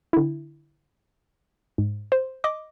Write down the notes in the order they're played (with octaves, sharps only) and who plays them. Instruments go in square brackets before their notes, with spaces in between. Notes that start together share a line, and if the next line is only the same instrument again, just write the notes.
[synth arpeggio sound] D3 E4
G#2
C5
D#5 D6